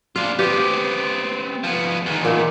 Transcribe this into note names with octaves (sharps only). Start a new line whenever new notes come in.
D4 F4 F5
B3 C4 G4
F3 B3
E2 D#3
A#2